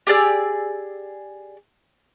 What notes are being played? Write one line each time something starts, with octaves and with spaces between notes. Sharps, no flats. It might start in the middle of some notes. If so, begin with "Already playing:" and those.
G4 G#4 D5 E6